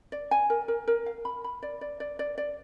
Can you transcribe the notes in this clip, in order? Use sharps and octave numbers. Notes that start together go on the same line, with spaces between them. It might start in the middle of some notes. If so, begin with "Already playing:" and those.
D5
G#5
A#4
A#4
A#4
F5
B5
B5
D5
D5
D5
D5
D5